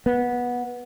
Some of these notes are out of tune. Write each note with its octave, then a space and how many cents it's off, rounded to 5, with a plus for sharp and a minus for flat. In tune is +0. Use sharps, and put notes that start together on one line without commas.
B3 -15